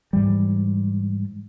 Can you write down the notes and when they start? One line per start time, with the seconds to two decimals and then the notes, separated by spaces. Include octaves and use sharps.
0.13 G#2 E3 G3